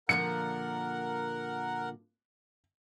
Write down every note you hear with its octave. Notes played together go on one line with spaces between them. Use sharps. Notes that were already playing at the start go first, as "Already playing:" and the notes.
A#2 D3 F3 A#4 F#5 C#7